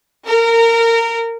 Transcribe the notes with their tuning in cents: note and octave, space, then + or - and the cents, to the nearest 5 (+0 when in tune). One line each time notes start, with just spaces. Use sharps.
A#4 -20